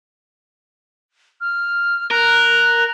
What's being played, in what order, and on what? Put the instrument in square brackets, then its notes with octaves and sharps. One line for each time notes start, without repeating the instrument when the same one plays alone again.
[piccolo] F6
[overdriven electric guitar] A#4 [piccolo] F#6